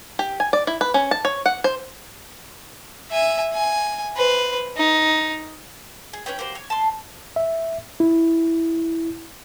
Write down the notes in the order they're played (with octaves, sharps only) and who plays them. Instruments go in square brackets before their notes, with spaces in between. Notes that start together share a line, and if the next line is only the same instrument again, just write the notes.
[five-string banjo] G4
G#5
D5
E4
B4
C#4
A5
C#5
F#5
C5
[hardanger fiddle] E5 G#5
G#5
B4 C5
D#4
[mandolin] G#4
C#4 B4 C#5 G5
A#3 F#4 G4 C5
C#5
A5 C6
[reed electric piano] E5
E4